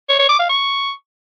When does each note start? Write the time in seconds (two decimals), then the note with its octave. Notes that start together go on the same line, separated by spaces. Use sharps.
0.09 C#5
0.19 C#5
0.29 D6
0.39 F5
0.49 C#6